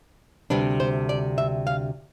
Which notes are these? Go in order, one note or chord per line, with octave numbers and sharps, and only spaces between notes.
D2 C3 G3 D4 B4
C5
D5
E5
F5